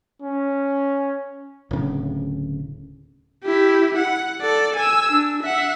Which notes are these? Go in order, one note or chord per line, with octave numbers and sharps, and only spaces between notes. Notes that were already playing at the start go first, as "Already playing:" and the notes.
C#4
D1 C#3
E4 G4
F#5
A4 D5
G#5 E6
D4
E5 F#5